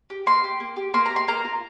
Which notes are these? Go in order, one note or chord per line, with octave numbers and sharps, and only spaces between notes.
G4
A#3 C6
G4
A#3
G4
A#3 C6
A#5
G4
C6
A#3 A#5
F4